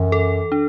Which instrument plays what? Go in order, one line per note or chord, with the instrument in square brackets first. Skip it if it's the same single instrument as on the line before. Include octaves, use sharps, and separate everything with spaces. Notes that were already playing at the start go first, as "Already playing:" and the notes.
Already playing: [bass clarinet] F#2 [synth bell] E3
[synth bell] A4
D4